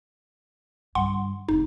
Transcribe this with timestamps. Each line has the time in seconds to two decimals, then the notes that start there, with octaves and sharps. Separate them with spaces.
0.95 G2 D3 F#5 C6
1.49 F1 D#3 D#4